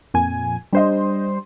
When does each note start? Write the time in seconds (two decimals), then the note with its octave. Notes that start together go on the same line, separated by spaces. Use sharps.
0.14 F2 A#2 G#5
0.73 G3 D4 C5 D#5